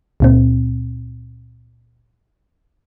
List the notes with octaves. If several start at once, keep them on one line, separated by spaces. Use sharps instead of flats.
C#2 A#2 C4